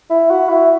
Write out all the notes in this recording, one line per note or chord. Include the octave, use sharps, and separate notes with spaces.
E4
F#4
E4